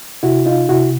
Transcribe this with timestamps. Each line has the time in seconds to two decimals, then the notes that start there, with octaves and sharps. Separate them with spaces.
0.23 C3 E4 F#4
0.46 D#4 F4
0.69 C3 E4 F#4